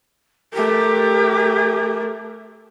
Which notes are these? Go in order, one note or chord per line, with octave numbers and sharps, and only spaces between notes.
A3 G4 A#4